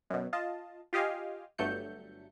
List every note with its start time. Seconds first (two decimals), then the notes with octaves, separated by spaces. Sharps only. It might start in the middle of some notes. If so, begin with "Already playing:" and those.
0.10 F#2 B2
0.33 F4 D#5 A5
0.93 F4 G4 D#5 F5 G#5
1.58 G1 G2 F#3 A3 G6 C#7